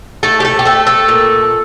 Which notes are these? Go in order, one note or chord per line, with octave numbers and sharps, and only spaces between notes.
A3 A4
G4
A4
G4
A3 A4
A4
A#2